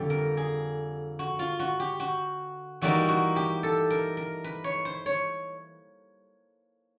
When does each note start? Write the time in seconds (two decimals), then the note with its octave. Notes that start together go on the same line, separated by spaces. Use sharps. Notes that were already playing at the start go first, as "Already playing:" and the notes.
Already playing: F2 D3 G3
0.10 A#4
0.37 G#4
1.19 F#4
1.39 F4
1.60 F#4
1.80 G4
2.00 F#4
2.82 E3 G3 A#3 D#4 F#4
3.09 F#4
3.36 G4
3.63 A4
3.90 A#4
4.17 A#4
4.44 B4
4.64 C#5
4.85 C5
5.06 C#5